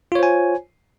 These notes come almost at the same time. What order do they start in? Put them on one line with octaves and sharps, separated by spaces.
F4 C#5 C5 G#5